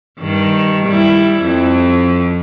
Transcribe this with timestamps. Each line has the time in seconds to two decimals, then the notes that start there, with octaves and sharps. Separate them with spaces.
0.19 G2 D#3
0.87 G3 E4
1.42 F2